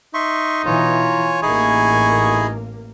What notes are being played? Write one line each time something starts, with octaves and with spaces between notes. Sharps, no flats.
D#4 E5 C6 C#6
B2 E3 F4 C#5 G#5 A#5
A1 A#3 D#4 E4 G#4 G#5 C#6